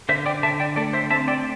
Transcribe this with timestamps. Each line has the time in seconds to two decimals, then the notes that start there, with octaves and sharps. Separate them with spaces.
0.09 D3 C5 E5
0.26 D5 G5
0.43 D3 E5 A5
0.60 D5 G5
0.76 A3 A4 D5
0.93 C5 E5
1.10 C4 E5 A5
1.28 D5 G5